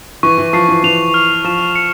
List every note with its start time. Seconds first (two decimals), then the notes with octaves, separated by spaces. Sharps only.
0.23 E3 C#6
0.38 E3
0.53 F3 C7
0.68 E3
0.84 E3 F7
1.14 F6
1.44 F3 E7
1.76 C#7